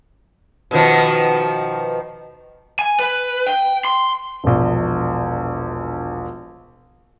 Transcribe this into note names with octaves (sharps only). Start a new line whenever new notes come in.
B2 D#3 F3
G#5
B4
G5
C6
E1 A#1